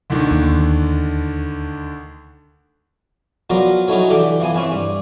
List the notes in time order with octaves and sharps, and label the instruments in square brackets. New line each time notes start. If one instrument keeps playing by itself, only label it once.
[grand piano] D2 D3 D#3
[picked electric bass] D#2
[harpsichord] F3 F#3 B3 F4 A#4 D5
F#3 C#4 D#4 E4 A4 C#5
D3 E3 G4 A4 D6
E3 F3 B3 G#5
E3 C4 C#4 E4 B4
G2